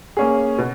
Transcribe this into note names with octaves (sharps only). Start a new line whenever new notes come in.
A#3 C#4 G#4
B2